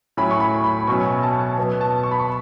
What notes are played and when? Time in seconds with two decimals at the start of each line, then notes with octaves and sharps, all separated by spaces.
0.17 A2 F#3 C#4 B5
0.31 C#6
0.40 B5
0.64 B5
0.80 B5
0.87 B2 F#3 C#4 C#6
1.23 A5
1.58 B2 F#3 B3
1.81 A5
2.03 C#6
2.11 B5
2.19 C#6